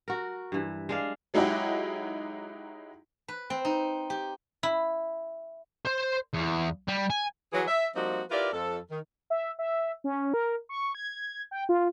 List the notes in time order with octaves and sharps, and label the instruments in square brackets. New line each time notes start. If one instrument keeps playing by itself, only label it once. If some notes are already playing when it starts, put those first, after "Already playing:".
[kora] F#4 A#4
G2 E3
G#3 D4 F5
[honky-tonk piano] F#3 G#3 D#4 E4 F#4 G4
[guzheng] B4
C4
D#4
G4
E4
[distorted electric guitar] C5
E2
G3
G#5
[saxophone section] E3 F#3 G#4
E5
F3 G3 A#3 C4 D#4 F#4
E4 F4 G4 A#4 B4 D5
F2 A4
D#3
[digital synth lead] E5
E5
C#4
A#4
C#6
G#6
G5
F4